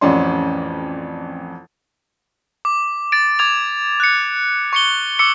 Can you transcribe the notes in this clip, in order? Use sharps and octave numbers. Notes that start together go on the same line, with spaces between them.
A1 F2 C#4 D5 C6
D6
A6 D7
D6 G#6 F7
F#6 C#7
C#6 C#7 G7
D6 E6 C#7 G7